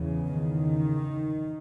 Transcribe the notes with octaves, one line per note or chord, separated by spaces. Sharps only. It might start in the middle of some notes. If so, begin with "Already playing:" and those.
Already playing: E2 C#3
D#3